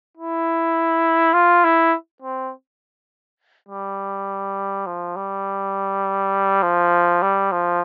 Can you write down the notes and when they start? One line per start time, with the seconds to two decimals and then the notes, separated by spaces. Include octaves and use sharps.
0.17 E4
1.34 F4
1.64 E4
2.22 C4
3.69 G3
4.87 F3
5.16 G3
6.62 F3
7.22 G3
7.52 F3